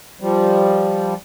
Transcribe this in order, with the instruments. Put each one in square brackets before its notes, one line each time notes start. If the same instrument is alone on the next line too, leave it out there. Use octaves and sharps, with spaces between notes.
[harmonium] F3 G3